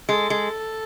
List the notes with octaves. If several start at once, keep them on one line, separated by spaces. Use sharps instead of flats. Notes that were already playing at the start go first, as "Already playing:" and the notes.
G#3 A4
G#3